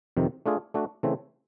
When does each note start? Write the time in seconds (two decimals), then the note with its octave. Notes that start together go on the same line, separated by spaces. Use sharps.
0.17 F2 C3 D#3
0.46 A3 D4 F4 G#4
0.74 A3 D4 F#4
1.03 C#3 E3 A3 C4